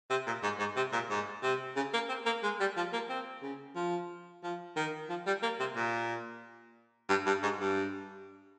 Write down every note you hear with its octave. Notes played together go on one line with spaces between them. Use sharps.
C3
A#2
G#2
G#2
C3
A#2
G#2
C3
C#3
A#3
C4
A#3
G#3
G3
F3
A#3
C4
C#3
F3
F3
D#3
F3
G3
A#3
C3
A#2
G2
G2
G#2
G2